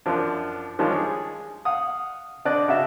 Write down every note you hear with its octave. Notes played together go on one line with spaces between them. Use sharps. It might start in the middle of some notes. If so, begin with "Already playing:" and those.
F#2 F3 D4
D#3 F3 G3 G#3 C#4 D4
G#4
F5 F#5 D#6
D3 C4 D4 D5 D#5 F#6
C#3 F#4 E5 A5